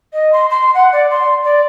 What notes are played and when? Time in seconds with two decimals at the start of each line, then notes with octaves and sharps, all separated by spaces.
0.13 D#5
0.32 C6
0.50 C6
0.74 F#5
0.92 D5
1.10 C6
1.43 D5